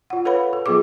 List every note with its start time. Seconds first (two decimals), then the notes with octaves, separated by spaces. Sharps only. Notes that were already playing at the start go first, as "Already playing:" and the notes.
0.10 F4 F#5
0.25 A4 B4 C#5 F5 F#5 B5
0.53 A4
0.66 F#3 B3 F4 G#4 D6